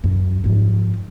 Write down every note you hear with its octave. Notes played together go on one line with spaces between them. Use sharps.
F#2
G#2 F3